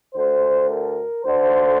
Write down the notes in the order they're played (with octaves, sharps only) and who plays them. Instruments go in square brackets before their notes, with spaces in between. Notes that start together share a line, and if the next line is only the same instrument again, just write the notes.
[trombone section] D2 D3 A3 C5
A#4
D2 D3 A3 C5